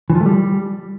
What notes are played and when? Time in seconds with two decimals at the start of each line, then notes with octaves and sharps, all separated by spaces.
0.10 E3
0.15 F3
0.20 A3
0.26 G3